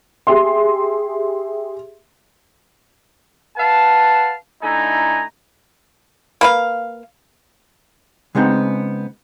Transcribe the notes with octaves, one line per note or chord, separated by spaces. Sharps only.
G4 G#4 E5 C6
B4 F5 F#5 A5
D3 A3 D#4 E4 G#5 A#5
A#3 B4 F5
C#3 G#3 B3 C4 D#4